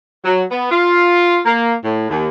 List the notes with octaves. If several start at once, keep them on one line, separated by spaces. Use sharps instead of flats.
F#3
B3
F4
A#3
A2
D#2